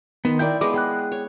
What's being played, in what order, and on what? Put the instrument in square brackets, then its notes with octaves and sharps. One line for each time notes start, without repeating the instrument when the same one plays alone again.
[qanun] D#3 C6 [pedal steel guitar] B3
[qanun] E4 D5 [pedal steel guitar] A#4 G5 G6
[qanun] G#3 B3 [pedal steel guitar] D6
[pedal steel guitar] G#4 G5 F#6
[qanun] C#5